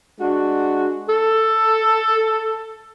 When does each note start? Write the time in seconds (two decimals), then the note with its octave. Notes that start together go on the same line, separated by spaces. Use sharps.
0.20 G#3 D4 F#4
1.09 A4